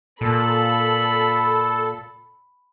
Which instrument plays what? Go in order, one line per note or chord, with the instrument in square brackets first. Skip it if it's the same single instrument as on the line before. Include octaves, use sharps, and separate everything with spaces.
[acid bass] A#2 [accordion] A4 [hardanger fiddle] B5